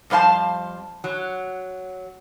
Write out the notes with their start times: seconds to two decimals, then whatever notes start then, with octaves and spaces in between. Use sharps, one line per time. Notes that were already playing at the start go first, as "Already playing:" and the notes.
0.10 F2 G3 C5 F5 A5
1.04 F#3